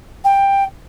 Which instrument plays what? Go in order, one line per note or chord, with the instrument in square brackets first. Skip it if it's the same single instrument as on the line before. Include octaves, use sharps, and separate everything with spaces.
[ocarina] G5